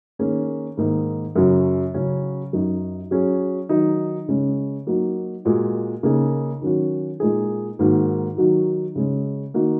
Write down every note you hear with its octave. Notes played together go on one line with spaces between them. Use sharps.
D#3 A#3 C#4 G#4
G#2 D#3 A#3 D#4
F#2 C#3 F#3 C#4 F#4
C#3 F#3 C#4 F#4
F#2 F#3 D#4 F#4
F#3 C#4 G#4
D#3 F#3 D#4
C#3 G#3 C#4
F#3 A#3 D#4 F#4
A#2 G#3 F#4
C#3 A#3 D#4 G#4
D#3 F#3 C#4 F#4
A#2 G#3 D#4 G#4
G#2 D#3 A#3 F#4
D#3 F#3 D#4 F#4
C#3 G#3 C#4
D#3 A#3 D#4 F#4